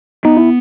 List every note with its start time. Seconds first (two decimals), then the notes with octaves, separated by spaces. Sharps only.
0.25 B3 D#4
0.37 E4